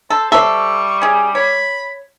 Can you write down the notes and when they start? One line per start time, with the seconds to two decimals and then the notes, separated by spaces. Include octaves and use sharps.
0.10 A4 C5 A5
0.32 G3 A4 C5 E5 C#6
1.02 C#4 G#4
1.35 C#5 B5